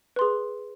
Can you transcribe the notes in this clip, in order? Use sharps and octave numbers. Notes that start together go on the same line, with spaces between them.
G#4 B4 C6